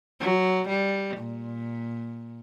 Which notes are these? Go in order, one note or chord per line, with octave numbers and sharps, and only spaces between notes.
F#3
G3
A#2